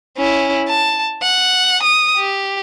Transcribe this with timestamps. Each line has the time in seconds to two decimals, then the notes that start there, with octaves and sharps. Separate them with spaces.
0.17 C#4 E4
0.68 A5
1.23 F#5
1.83 D#6
2.17 G4